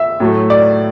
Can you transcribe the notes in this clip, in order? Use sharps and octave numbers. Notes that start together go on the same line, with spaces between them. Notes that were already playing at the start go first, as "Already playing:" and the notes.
Already playing: E5
A2 F#3 A3
D5